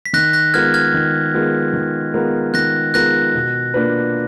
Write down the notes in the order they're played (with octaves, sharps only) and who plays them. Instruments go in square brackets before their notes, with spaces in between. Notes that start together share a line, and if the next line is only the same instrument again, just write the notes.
[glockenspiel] B6
[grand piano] D#3 [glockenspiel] F#6 A#6
[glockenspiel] F#6 A#6
[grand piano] G#3 B3 F4 A#4 [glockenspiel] F6 G#6
[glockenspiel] F6 G#6
[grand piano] D#3
G#3 B3 F4 A#4
D#3
G#3 B3 F4 A#4
[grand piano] D#3 [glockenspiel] F#6 A#6
[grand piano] G#3 B3 F4 A#4 [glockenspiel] F#6 A#6
[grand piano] B2
A#3 D4 F4 B4